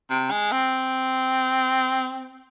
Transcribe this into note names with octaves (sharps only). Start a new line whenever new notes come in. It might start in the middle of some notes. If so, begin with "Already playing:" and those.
C3
G#3
C4